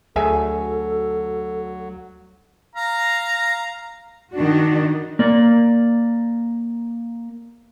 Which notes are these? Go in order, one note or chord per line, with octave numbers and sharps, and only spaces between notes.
D2 F#3 G#4 A4 E5 G#5
F5 A#5
D#3 D4 F#4
A#3 D5